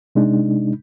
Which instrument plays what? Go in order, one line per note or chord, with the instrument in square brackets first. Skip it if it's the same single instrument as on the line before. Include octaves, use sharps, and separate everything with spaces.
[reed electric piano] C3 G#3 D4 D#4